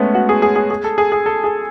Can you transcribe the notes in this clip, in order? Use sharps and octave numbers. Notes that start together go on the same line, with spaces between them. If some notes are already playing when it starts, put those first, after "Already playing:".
Already playing: G#3 A3 B3 C#4
F#4
G#4
G#4
G#4
G#4
A4
G#4
G#4
A4
G#4